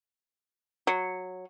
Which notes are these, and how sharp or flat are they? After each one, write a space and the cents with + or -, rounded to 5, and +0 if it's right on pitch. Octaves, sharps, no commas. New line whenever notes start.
F#3 -10